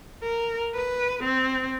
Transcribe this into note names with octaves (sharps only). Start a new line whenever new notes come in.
A#4
B4
C4